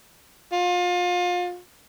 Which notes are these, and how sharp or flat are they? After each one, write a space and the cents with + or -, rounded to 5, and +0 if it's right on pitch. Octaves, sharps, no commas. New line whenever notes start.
F4 +30